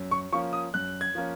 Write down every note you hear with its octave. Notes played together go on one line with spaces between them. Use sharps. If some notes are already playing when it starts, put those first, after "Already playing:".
Already playing: F#2
C#6
F3 A#3 C#4 C#6
D#6
F#2 F#6
G#6
F3 A#3 C#4